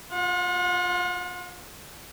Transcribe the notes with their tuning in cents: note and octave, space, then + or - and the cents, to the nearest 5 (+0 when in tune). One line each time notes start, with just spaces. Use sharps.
F4 +10 F#5 -45